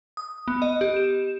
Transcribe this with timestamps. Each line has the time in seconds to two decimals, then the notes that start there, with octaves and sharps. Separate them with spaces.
0.17 D#6
0.48 B3
0.62 D#5
0.81 G4
0.96 E7